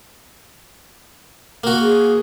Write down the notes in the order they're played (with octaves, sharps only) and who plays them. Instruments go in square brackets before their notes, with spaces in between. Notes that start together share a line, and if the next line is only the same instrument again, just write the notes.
[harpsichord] A#3 F#4
[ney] G#4